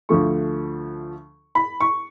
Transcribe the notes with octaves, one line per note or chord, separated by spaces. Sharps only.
D2 D3 F3 A3 C#6
B5
C#6